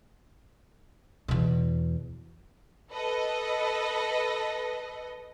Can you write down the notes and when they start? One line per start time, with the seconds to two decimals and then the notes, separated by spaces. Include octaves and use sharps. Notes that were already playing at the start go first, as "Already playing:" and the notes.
1.28 E2 B2
2.92 A4 B4 D#5